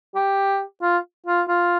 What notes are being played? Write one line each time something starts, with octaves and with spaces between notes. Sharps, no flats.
G4
F4
F4
F4